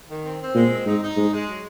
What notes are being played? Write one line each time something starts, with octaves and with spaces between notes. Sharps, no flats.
D#3
C4
C4
A#2 G#3
C4
G#2 D#4
D#4
G#2 G#3
G#3
F#3